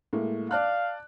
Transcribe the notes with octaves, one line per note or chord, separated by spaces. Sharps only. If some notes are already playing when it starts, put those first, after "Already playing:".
A2 G#3 A#3
D5 F5 A5 F#6